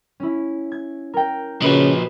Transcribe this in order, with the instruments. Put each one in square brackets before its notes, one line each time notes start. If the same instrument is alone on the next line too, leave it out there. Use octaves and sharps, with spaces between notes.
[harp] C#4 E4
G#6
A#4 G5
[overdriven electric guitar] A#2 F3 [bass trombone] C#3 [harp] F#4 B4 D#5